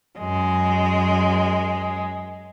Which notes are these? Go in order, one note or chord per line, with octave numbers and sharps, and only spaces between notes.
F#2 G#3